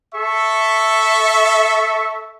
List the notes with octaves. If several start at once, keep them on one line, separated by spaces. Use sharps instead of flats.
A4 E5 C#6